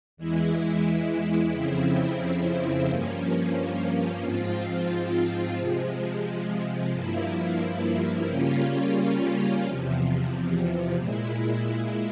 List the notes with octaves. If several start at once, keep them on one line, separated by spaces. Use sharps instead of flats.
E2 E3 G#3 E4
F2 C#3 F3 C4 E4
G2 F3 A#3 C#4
G#2 F3 C4 F4
C3 F3 G#3
G2 F3 A#3 E4
C#3 G3 A#3 C#4 F4
E2 C3 F3
A#2 G#3 E4